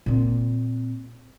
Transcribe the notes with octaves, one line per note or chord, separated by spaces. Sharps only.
A#2 C4